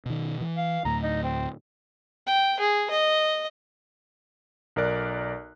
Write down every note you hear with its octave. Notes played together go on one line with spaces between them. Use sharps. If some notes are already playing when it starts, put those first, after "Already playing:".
B2 D#3
E3
F5
D2 A2 A#5
D#4
C4
G5
G#4
D#5
B1 A#4 D5 F#6